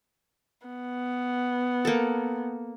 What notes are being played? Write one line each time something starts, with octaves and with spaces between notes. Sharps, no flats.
B3
A#3 A4